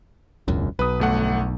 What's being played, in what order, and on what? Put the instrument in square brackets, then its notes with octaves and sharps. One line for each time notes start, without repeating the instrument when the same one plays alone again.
[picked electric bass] E1 C#2 F#2
[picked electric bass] B1 [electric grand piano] B4 D#6
[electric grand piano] G1 A3 F#5